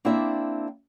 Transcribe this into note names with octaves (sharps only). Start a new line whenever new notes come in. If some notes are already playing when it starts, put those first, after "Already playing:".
A#3 C4 D4 E4 D5 E5